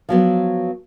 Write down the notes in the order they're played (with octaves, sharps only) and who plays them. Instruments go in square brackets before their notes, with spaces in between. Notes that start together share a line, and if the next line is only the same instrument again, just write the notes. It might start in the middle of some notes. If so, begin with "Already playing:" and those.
[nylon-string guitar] F3 F#3 B3